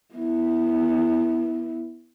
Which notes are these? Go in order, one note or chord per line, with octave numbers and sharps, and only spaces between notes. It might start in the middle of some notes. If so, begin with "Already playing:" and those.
B3 E4